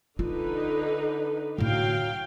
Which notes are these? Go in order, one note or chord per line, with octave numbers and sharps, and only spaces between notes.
D3 D#4 F4 B4
A2 D3 F#3 F5 G5